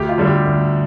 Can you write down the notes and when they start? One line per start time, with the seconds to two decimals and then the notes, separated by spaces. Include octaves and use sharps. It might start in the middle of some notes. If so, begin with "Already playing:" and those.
Already playing: D2 G4
0.09 F4
0.18 D3 G3 D4
0.27 G4
0.46 D2